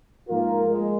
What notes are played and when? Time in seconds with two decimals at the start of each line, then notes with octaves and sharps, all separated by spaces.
0.29 G#2 F3 A#3 F4 A#4
0.69 G#3